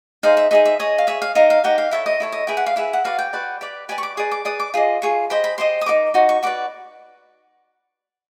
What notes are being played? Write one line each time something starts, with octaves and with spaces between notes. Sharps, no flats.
D#4 G#4 C5 F5
E5
D#4 G#4 C5 E5
E5
G#4 C#5 D#5
F5
G#4 C#5 E5
F5
D#4 G4 A#4 F5
F5
D#4 G4 A#4 F#5
F5
E4 A4 C#5 E5
D#5
E4 A4 C#5
D#5
E4 G#4 B4 G5
F#5
F5
E4 G#4 B4 E5
F#5
F#4 B4 D5 F5
G5
F#4 B4 D5
G4 B4 D5
G4 B4 D5 G#5
C#6
D6
G#4 B4 D5 D#6
D6
G#4 B4 D5 D#6
D6
F4 G#4 D#5
F4 G#4 C#6
G4 C5 D#5 B5
B5
G4 C5 D#5 C6
D#6
D#4 F#4 A#4 D6
D#4 F#4
C#6
F#4 B4 D5 D6